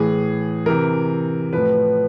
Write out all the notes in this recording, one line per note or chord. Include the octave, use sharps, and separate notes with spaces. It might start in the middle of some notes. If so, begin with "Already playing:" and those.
Already playing: A2 E3 G#4
C3 E3 A#4
A2 F3 B4